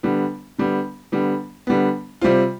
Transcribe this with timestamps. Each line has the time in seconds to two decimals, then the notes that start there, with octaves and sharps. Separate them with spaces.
0.03 D3 G3 B3
0.58 D3 G3 B3
1.12 D3 G3 B3
1.67 D3 G3 B3
2.21 C3 G3 C4 F4